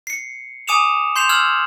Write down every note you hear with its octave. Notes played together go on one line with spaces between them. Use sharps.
C7 C#7
G#5 D6 D#6 C#7 E7 F7
C6 G6 C7 E7 F7
E6 F6 G#6 F#7